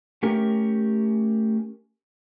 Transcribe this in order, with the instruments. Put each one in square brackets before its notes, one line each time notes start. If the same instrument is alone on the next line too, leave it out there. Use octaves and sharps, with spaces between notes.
[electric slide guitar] A3 C#4 G4 A#4